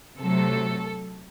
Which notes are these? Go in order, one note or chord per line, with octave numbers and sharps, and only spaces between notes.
C3 F#3 A3 A4